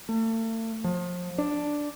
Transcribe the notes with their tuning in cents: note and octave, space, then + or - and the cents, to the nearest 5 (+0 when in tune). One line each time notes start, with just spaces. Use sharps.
A3 +40
F3 +30
D4 +0